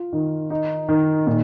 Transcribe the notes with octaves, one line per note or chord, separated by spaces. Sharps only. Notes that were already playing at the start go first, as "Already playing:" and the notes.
Already playing: F4
D#3
D#4
D#3
A#2